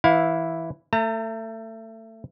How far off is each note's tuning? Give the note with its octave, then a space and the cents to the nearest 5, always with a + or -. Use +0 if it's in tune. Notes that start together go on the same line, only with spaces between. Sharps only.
E3 +0 E4 +0 F5 +25
A3 +25 A#5 -40